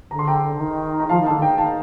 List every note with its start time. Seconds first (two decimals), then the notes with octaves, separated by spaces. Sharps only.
0.11 D3 A#5
0.19 C6
0.27 G5 A#5
0.55 D3
0.60 D#3
1.00 A#5
1.09 F3 F5 A5
1.20 D#3
1.26 D3 F5 A5
1.41 D#3 G5 A#5
1.58 D#3 F5 A5